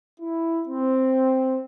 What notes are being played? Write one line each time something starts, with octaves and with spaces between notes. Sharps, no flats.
E4
C4